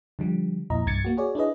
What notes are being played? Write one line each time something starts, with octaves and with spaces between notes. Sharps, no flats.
D3 F3 G3
F2 A#2 E4 D#5 A#5
C2 G2 G#6 A6 C#7
A#3 F#4
F#4 G#4 C#5 D5
D4 E4 G#4 B4 D#5